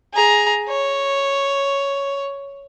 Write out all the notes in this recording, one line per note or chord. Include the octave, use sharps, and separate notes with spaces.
G#4 A#5
C#5